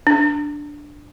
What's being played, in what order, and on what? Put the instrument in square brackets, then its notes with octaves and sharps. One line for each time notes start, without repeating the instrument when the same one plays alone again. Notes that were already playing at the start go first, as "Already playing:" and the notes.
[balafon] D4